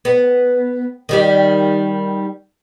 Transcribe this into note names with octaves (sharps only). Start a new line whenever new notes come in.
B3
D#3 G3 G4